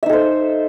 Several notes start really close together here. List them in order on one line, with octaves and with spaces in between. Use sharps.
E5 D#4 A4 C5